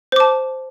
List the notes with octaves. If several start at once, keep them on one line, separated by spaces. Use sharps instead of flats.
C5 A5 D6